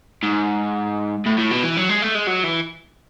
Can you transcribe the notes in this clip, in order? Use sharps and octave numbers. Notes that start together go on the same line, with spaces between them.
G#2
A2
A2
B2
E3
F#3
G#3
A3
G#3
F#3
E3